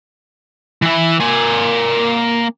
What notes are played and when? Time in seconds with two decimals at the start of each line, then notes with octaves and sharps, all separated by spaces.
0.82 E3 E5
1.20 A#3 G#5